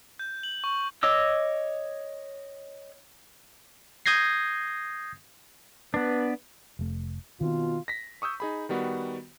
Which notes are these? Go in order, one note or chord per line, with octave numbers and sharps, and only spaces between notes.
G6
F#7
C#6
C#5 D#5 D6 E6
D#6 G6 G#6 A#6 C7
B3 D4 B4
F1 A3
B2 D#3 C4 F4
A#6 B6
C#6 D#6 E6 G6
D#4 G#4 B5
D#3 G3 B3 F#4